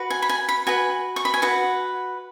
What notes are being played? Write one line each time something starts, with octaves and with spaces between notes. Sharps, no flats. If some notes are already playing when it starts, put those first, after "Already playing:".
Already playing: F#4 B4
G#5
B5
G#5
B5
F#4 B4 G#5
C#6
B5
G#5
F#4 B4 F#5